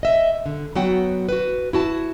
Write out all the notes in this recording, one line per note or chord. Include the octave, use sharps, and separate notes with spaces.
D#5 E5
D3
F#3 B3 F#4 F#5 G5
F#4 B4
E4 F#4 A5